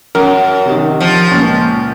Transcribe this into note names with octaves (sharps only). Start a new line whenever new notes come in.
F#2 A#4
C3 D#3
F3
C#2 A#2